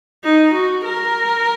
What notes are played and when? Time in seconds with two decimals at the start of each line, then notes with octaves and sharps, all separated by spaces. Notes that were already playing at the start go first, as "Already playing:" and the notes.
0.24 D#4
0.54 F#4
0.85 A#4